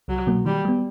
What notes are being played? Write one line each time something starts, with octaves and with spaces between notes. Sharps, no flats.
C2 F#3
B2 F#3 A#3
D#3 G3
G3 B3